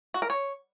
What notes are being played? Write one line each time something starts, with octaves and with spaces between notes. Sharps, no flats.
F#4
A#4
C#5